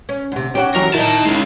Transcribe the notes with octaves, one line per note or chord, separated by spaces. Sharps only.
C#4
D2 C3
C#4 D4 F#4 G4
F#2 E3 F#3 A#4
D#3 D#4 E4 D#5 A5
C#3 G#3